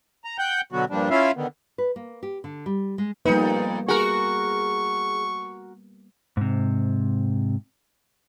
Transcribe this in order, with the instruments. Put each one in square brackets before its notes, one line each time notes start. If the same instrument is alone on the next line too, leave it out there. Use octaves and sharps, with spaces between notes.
[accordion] A#5
F#5 G5 G6
B2 D3 F#3 B3 F#4
G2 A#2 F3 G3 D4
C#4 E4 F4 E5 F5
D3 D#3 B3
[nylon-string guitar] B4
A#3
G4
D3
G3
G#3
[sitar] F2 D#4 [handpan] G3 A#3 B3 [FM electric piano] B4
[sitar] F#4 A#4 [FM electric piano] G#4 [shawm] C#6
[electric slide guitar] G#2 C3